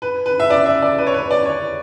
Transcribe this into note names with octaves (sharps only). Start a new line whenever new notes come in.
B4
B4
E5
D5
E5
D5
B4
C#5
B4
D5
C#5